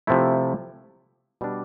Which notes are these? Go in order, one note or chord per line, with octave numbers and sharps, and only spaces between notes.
C3 F3 A3 E4
B2 G3 D4